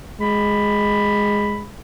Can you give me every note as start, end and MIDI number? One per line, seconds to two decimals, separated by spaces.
0.21 1.68 56
0.21 1.63 83